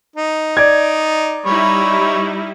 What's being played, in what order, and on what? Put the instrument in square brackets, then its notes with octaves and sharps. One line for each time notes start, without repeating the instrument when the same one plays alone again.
[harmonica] D#4
[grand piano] D5 G#6
[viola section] G3 D#4 E4 [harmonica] C#5 B5